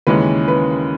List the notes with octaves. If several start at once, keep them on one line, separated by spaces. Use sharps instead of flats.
D#2 C#3 E3 G#3 C#4 B4
B4